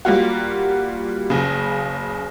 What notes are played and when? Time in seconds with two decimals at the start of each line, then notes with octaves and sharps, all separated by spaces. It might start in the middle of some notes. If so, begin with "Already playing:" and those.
0.05 G3 A#3 F4 F#4
1.30 F#1 C#3